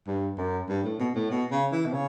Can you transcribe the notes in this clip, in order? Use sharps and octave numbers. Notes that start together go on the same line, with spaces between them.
G2
F#2
G2
A2
B2
A2
B2
C#3
E3
B2
C#3